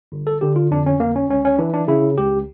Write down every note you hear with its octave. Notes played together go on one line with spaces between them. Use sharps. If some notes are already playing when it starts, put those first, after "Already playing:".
G1
A4
D3 G4
F4
F2 D4
C#4
G1 A#3
C#4
C#2 C#4
C#4
E3 D4
D4
C#3 E4
C#2 G4